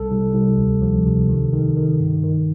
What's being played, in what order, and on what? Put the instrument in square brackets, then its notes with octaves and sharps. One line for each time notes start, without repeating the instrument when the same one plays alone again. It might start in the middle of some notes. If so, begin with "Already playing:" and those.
Already playing: [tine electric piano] C2 A4
C2
C2
D2
F3
C3
D#3
D#3
D#3
G2
D#3